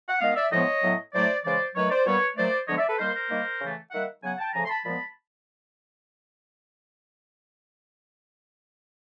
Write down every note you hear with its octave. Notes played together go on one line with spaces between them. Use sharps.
F#5
D#3 G#3 B3 D#5 F5
D5 E5
A2 F3 G#3 B3 C#5 D#5
A2 F#3 B3
A2 F#3 A3 C5 D5
C#3 E3 G#3 C5 D5
D#3 F#3 A3 B4 C#5
C5 D5
A#2 G3 B3 B4 C#5
A#2 F#3 A3 C5 D5
D3 F3 G#3 B3 C#5 D#5
D5 E5
A4 B4
D#3 G3 A#3 A#4 C5
A#4 C5
D#3 G3 A#3
C#3 E3 A3
D#3 G3 A#3 E5 F#5
C#3 F#3 B3 F#5 G#5
G5 A5
C#3 F3 A3 G#5 A#5
C6
A5 B5
A#2 F3 G#3 B3 A5 B5